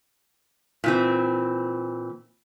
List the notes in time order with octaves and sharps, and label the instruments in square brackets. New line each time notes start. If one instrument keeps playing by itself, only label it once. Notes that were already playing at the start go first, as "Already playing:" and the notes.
[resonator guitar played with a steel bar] A#2 E3 C4